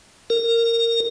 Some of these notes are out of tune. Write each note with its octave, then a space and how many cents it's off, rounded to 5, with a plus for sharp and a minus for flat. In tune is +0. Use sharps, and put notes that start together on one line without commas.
A#4 -15